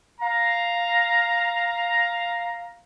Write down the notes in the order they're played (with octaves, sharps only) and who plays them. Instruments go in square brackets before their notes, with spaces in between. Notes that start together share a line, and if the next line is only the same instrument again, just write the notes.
[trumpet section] F5 A#5